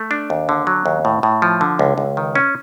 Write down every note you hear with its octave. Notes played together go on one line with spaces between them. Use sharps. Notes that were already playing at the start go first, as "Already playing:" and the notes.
Already playing: A3
D4
D#2
D3
F#3
D#2
A2
A2
F3
D3
C#2
C#2
D#3
C#4